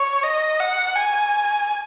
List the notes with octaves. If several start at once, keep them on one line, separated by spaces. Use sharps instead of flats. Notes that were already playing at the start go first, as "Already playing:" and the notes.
Already playing: C#5
D#5
F#5
G#5